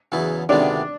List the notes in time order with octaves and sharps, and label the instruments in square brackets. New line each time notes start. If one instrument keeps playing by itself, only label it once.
[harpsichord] E2 C#3 F#3 B3 E4
[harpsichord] D2 C3 D#3 G#3 B3 [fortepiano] D4